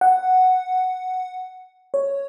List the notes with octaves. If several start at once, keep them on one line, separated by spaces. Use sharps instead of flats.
F#5
C#5